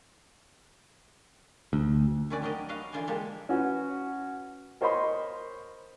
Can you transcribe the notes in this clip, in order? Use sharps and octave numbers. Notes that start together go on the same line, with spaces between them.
D2
D#3 C4 C#4 B4 D5
F#3 D4 G4 A#4 D#5
F#4 B4 D#5 F5
D3 E3 F4 C5 D5 G#5
F3 G#3 A#3 G4 A4
C#4 F#4 B4
A#4 C5 C#5 D#5 B5 C6